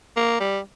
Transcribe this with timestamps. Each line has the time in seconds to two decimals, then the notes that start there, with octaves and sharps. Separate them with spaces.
0.16 A#3
0.40 G3